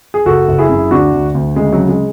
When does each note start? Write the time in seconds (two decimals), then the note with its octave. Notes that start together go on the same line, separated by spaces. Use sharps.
0.14 G#4
0.25 F#1 F#4 A4
0.48 F#1
0.59 E4 G#4
0.69 F#2
0.91 D2 D4 F#4
1.13 D2
1.34 D2
1.56 C#3 G#3
1.72 F#3
1.78 C#3
1.88 G#3